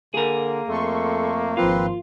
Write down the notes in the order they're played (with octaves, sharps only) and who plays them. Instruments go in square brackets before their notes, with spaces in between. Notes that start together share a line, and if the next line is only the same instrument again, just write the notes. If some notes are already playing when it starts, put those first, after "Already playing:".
[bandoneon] D3 [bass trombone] A#3 [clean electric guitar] G#4 A#4
[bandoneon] F2 A3 [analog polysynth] A4 C6 C#6
[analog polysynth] G#1 F3 C6 [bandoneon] C4 B4 [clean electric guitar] F4